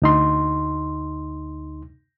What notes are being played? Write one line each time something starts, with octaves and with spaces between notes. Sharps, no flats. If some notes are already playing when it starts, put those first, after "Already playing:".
D2 D#4 C6